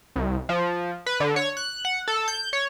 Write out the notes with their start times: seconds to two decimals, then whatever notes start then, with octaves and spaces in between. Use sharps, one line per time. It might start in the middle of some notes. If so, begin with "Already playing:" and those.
0.16 C2
0.49 F3
1.06 B4
1.20 D3
1.36 C#5
1.57 F#6
1.85 F#5
2.08 A4
2.28 G6
2.53 C#5